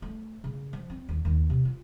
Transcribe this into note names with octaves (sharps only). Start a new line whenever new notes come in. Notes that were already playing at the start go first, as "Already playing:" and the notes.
A3
C#3
F3
C4
D#2
D#2
C3
F4